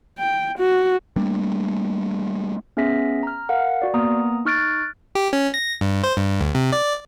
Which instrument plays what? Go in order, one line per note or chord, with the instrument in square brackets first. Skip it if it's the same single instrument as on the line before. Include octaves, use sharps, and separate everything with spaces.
[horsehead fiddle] G5
F#4
[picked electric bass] G3 A3 A#3 D4
[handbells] B3 C#4 G#4 E5 A#6 B6
A#5 F6
A#4 F5 F#5
F#4 D5
A#3 B3 A#5 D#6
D#4 C#6 F6 F#6 A6 D7
[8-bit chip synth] G4
C#4
A#6
G2
C5
G2
D2
C3
D5